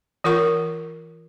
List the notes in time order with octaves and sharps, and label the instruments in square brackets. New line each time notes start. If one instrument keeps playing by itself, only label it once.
[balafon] E3 F4 A#4 F#5 C#6